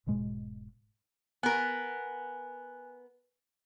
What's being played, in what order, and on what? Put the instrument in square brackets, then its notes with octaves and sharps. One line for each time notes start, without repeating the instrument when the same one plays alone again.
[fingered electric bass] E1 G#2 B2 G#3
[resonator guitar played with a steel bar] B3 A#4 [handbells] G#5 F#6